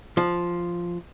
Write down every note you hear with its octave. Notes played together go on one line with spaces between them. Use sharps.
F3